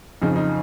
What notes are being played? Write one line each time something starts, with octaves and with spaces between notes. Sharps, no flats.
F2 C#3 F3 D#4
D#4